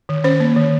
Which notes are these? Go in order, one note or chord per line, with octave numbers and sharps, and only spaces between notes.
D#3
C#4 C5
A#3
D#3